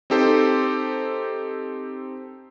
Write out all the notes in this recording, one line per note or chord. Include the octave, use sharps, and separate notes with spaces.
C4 D#4 G4 A4 C5